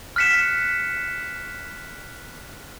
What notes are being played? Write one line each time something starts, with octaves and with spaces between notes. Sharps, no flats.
F6 F#6 B6 C#7 E7